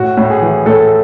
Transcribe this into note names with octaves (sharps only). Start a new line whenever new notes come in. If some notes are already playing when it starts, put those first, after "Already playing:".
Already playing: A2 F#4
A2
G#4
E3
A2 A4